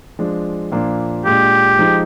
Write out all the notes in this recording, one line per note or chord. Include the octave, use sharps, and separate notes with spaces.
F3 G#3 D4
A#2 F3 A#3 D4
A#2 G#3 D4 G4
F3 G#3 D#4